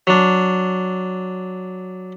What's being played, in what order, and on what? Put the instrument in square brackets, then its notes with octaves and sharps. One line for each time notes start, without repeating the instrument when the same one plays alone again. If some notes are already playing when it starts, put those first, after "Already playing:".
[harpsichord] F#3 D4